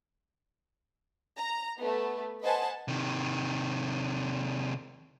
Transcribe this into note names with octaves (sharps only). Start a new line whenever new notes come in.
A#5
A3 B3
B4 C5 D#5 F#5 G#5 A5
C3 D#3